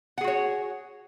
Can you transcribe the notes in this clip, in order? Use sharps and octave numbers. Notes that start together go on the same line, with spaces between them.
F#4 G#4 C#5 F#5